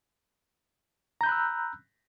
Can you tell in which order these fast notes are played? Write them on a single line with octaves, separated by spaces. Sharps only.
A#5 G6 B5 F#6 E6